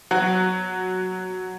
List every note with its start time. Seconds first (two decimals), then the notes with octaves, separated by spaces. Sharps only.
0.11 F#3 F#4